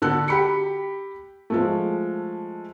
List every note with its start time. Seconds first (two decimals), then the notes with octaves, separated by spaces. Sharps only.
0.02 D3 F#4 A4 F#6
0.28 G4 B5 C#7
1.50 F3 G#3 A3